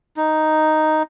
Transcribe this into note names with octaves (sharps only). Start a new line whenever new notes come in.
D#4